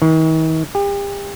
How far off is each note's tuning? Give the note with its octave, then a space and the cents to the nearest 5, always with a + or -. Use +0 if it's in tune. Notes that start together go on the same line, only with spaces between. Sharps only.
D#3 +45
G4 +40